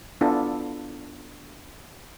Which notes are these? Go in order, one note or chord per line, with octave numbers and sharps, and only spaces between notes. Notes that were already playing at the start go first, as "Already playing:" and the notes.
B3 D4 E4 F4 A4